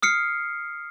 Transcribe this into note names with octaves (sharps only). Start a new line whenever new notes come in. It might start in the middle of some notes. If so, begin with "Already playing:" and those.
D#6 F6 C7 C#7